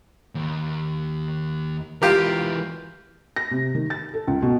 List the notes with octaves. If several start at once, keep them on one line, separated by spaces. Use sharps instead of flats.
D#2
E3 G#3 F4 G4 A#4
A#6
C3
D#3
A6
A4
C#2
B2